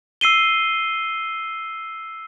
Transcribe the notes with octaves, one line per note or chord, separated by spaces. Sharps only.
E6 C7 D#7 G7